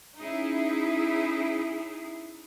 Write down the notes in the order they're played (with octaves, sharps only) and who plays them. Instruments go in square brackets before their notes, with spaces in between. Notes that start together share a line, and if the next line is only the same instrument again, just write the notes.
[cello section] C#4 D#4 E4 G#4